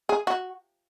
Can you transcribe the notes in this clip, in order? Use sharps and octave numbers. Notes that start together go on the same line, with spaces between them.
G#4
F#4